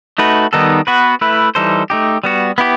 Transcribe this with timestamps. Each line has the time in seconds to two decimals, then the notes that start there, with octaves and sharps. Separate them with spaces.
0.18 A3 D#4 F#4 B4
0.53 D#3 G3 B3 D#4 A4
0.87 B3 F#4 B4
1.21 A3 E4 B4
1.55 E3 G3 D#4 A4 C5
1.90 A3 D#4 G4
2.24 G3 B3 F#4
2.58 B3 E4 G4